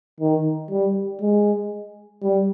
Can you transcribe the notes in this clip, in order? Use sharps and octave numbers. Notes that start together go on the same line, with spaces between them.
D#3
G3
G#3
G3